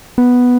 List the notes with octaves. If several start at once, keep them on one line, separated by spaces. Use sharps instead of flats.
B3